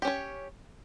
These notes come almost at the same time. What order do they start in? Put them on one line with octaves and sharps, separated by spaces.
G4 C#4 C#5